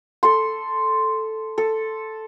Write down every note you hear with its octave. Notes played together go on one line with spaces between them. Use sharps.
A4 C6
A4